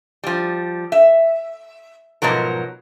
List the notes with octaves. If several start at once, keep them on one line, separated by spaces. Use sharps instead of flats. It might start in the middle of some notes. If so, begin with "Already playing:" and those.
F3 G3
E5
G#2 B2 F3 F#3 A#4